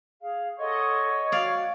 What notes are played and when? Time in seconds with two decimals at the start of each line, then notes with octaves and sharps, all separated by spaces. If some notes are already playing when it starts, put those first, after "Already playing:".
0.22 G#4 F5
0.59 A4 C#5 D#5 F#5 C6
1.32 F#4 D5 F5